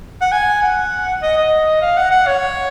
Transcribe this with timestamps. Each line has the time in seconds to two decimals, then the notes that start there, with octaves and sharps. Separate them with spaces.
0.21 F#5
0.32 G#5
0.62 F#5
1.23 D#5
1.37 D#5
1.81 F5
1.97 F#5
2.11 F#5
2.27 C#5